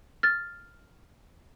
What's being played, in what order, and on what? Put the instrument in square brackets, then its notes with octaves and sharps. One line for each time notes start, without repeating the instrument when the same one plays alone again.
[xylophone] F6 A6